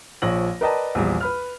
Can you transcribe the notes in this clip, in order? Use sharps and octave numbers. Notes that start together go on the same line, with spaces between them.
A#1 F3 C#5 A#6 F#7
A#4 B4 D5 D#5 G5 A5
A#1 E2 G3
B4 B5 F6